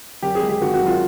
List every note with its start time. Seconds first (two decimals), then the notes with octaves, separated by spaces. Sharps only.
0.23 F#2 G4
0.35 G#4
0.42 G#3
0.49 G4
0.61 D#3 F#4
0.74 F#4
0.81 F#2
0.86 F4